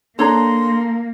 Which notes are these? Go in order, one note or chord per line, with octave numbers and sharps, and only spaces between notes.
A#3 D4 A4 C#5 A#5 C6